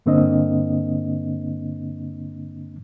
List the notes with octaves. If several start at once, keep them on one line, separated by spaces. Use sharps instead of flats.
G2 D3 A#3 C4 D4 D#5